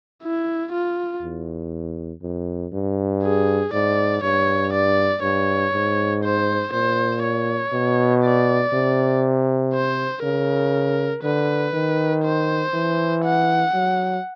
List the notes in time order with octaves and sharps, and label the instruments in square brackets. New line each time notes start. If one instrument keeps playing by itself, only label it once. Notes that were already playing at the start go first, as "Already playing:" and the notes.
[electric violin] E4
F4
[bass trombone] E2
F2
G2
[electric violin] G#4
[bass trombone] G#2 [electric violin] D5
[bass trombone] G2 [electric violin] C#5
[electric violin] D5
[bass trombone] G2 [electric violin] C#5
[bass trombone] G#2
[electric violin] C5
[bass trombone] A#2 [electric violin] C5
[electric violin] C#5
[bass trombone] B2
[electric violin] D5
[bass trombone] C3
[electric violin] C5
[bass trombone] C#3 [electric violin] A#4
[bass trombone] D3 [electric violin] B4
[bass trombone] D#3
[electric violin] C5
[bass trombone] E3
[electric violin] F#5
[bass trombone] F#3